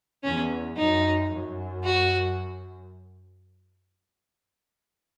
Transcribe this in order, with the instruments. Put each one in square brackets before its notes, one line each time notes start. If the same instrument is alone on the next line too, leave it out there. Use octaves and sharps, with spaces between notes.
[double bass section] E2 [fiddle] C#4
[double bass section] F#2 [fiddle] D#4
[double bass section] F#2
[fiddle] F#4